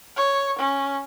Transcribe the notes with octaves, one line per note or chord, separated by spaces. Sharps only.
C#5
C#4